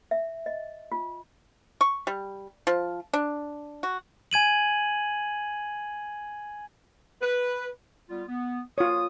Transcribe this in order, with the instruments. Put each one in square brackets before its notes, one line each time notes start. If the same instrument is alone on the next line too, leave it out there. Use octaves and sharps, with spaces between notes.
[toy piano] E5
D#5
F4
[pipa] C#6
G3
F3
D4
F#4
[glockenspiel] G#5 G#6 D#7 F#7
[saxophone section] B4
[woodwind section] G3 B3 F4
B3
[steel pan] F4 C#5 [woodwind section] D#6